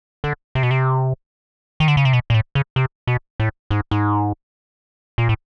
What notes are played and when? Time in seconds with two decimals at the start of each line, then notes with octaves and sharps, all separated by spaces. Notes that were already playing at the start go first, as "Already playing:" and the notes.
0.24 D3
0.55 C3
0.63 B2
0.71 C3
1.80 D#3
1.88 D3
1.97 C#3
2.05 C3
2.13 B2
2.30 A#2
2.34 A2
2.55 C#3
2.76 C3
3.07 B2
3.40 A2
3.71 G#2
3.91 G#2
5.18 A#2
5.29 A2